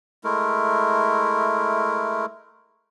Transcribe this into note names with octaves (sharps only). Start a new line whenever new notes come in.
G#3 A3 E4 A#4